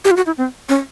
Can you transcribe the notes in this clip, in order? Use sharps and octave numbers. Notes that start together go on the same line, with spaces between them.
G4
F4
F#4
E4
C4
C#4